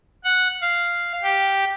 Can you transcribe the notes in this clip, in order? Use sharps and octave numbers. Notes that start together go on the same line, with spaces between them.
F#5
F5
G4